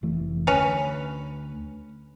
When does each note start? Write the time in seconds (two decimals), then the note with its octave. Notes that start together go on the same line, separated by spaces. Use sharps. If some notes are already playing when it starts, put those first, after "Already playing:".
0.03 F1 E3 A3
0.47 D2 C#4 B4